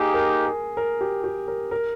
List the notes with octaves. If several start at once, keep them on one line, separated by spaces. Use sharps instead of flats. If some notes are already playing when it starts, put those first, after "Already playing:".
Already playing: A#3 D#4 G4 G#4
A#4
A#4
A#4
G4
G4
A#4
A#4